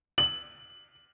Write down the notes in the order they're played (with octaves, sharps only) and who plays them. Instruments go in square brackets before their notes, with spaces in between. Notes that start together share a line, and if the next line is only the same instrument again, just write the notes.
[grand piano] F#7